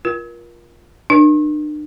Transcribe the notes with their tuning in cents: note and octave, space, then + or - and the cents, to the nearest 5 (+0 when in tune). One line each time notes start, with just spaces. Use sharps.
F4 +0 A#4 +30
D4 +40 A#4 +40